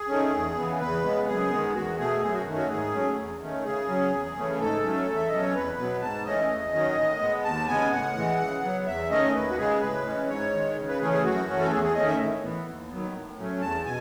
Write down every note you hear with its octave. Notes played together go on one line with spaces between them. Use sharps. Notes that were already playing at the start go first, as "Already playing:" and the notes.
Already playing: G#4
D#3 A3 C#4
E2
C#3 E3 B3
E2 B4
C#3 G#3 B3
F#2 G#4
D#3 G#3 B3
E2 F#4
B2 A3 G#4
F#2 G#4
F#4
D#3 A3 C#4
F#4
G#2 G#4
F#3 A3 C#4
E2
D#3 A3 C#4
C#3 G#4
F#3 C#4
E2
C#3 E3 A3 C#4
G#2 A4
F#3 A3 C#4
E2
E5
B2 F#3 C#4 D#5
C#5
E2 B4
B2 F#3 B3
G#2 A5
E3 A3 C#4 D#5
E2
D#3 F#3 C#4
A2
G#3 B3
D#2 A5
C#3 G#3 B3 G#5
A2 F#5
E3 G#3
C#3
F#3 B3
E2 E5
D#3 A3 C#4 D#5
D#2 B4
F#4
C#3 G#3 G#4
A2 B4
E3 G#3 C#4
G#2 C#5
D#3 G#3
C#3
B4
E3 A3 C#4 G#4
G#4
F#2 F#4
E3 A3 C#4
A4
E2 G#4
G#4
D#3 A3 C#4 D#5
E5
A2
E3 B3
D#2
D#3 F#3 B3
A2
F#3 A3 C#4
E2 A5
B2 G#5